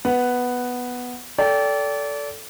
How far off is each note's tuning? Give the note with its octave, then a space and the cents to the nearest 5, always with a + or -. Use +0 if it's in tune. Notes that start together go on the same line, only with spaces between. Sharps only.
B3 +0 F#5 +0
A4 +0 D5 -30 G5 +0